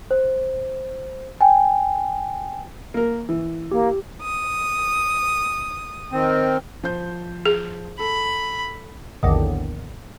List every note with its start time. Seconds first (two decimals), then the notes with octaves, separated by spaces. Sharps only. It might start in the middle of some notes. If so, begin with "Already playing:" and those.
0.11 C5
1.41 G5 G#5
2.94 A#3 A#4
3.29 E3
3.71 A#3 G4
4.21 D#6
6.12 D#3 C4
6.84 F3 C5 G6
7.46 G#4
7.99 A4 B5
9.23 A#1 E2 A2 D3 D#3